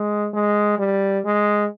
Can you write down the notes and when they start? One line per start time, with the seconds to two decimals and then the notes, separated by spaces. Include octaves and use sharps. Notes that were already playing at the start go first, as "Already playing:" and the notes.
Already playing: G#3
0.34 G#3
0.79 G3
1.25 G#3